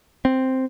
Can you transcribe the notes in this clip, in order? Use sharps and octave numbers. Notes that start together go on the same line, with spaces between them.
C4